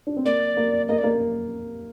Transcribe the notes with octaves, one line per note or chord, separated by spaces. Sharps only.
D4
C4
A#3 D5
A#3
A#3 D#5
D5
A#3